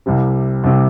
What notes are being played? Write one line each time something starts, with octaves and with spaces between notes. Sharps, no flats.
C2 C3 G3
C2 C3 G3